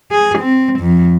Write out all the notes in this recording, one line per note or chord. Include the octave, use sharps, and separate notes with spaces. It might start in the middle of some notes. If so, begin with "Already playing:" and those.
G#4
C4
F2